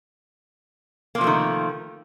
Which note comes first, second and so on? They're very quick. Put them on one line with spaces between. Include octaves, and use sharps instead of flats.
A#3 C3 F3 A3 D#3